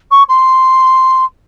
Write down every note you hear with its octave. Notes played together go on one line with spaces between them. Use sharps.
C#6
C6